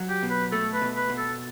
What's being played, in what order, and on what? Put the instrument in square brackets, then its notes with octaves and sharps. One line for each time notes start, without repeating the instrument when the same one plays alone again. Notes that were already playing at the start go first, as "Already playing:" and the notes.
Already playing: [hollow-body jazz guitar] F#3
[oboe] G4
[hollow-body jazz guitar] B2
[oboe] B4
[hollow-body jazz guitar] A3 [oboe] A4
[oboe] B4
[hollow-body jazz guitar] B2
[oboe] B4
[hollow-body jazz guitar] B2
[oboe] A4